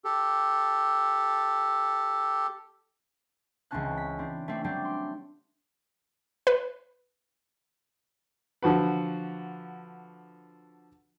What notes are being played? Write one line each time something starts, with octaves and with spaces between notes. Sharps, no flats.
G4 A4
C#2 E3 C4 C#4 A5 F#6
B6
C4 D4 E4
A3 C4 D4
F#3 G3 A3 C4 D4 G4
C6
B4
D3 F3 F#4 B4